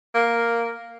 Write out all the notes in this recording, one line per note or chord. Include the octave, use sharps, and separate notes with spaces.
A#3